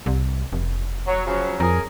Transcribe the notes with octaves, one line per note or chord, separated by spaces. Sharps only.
C2
F1
F#3
C#3 F3 F#3
F2 G#4 A#4